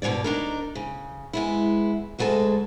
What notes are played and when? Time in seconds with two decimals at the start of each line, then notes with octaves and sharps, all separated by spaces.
0.02 G2 B2 F3 C#5 D5
0.24 D4 D#4 A#4
0.75 C#3
1.33 G#3 B3 E4
2.19 D2 F#3 G#3 A4 A5